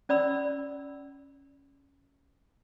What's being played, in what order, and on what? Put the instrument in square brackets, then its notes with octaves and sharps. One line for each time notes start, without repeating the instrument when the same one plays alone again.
[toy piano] C#4 D5 B5 E6